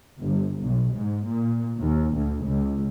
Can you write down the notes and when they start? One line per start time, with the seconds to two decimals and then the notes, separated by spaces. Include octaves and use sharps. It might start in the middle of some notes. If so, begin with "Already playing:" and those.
0.21 G1
0.62 B1
0.95 G#2
1.28 A#2
1.81 D#2
2.16 D2
2.46 C#2